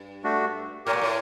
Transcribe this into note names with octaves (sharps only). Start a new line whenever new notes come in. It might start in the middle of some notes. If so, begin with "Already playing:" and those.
Already playing: G2
A3 D4 F#4
A2 G4 A#4 C#5
A#2
A2